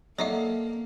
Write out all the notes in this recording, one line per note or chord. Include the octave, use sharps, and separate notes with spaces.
F#3 A#3 D#4 A4 D5 E5 F#5 D6